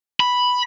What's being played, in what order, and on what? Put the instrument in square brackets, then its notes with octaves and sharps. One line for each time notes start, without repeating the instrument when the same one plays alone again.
[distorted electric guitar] B5